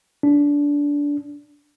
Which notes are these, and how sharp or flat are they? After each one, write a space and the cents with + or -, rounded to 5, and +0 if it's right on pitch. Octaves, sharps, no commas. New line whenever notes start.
D4 -20